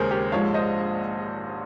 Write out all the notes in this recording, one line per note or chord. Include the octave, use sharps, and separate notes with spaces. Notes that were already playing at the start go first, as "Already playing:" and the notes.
Already playing: D#2 C#3 G#3 G#4 A#4 C5 C#5
G4 A#4
A#1 G#2 F3 G#3 C#5 F5
C5 D#5